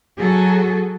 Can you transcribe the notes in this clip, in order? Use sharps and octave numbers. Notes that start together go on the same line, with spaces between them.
F#3 F#4 G#4 A4